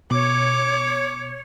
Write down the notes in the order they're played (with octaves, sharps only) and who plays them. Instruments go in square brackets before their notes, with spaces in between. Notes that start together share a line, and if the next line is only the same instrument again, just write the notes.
[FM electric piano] B2 [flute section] C#5 [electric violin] D6